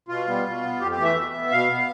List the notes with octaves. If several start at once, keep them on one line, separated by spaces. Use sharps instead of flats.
B2 F4
G3 B3
B2
B3
F2 G4
G4
E3 A3
E5
B2
B3
B2 F5
B3